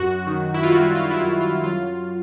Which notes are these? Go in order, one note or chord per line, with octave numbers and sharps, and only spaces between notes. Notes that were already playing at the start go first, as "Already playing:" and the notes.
Already playing: F#2 F#4
D#3
E4
F4
G3 F#4
F4
E4
F#2 F4
F4
F#3 F4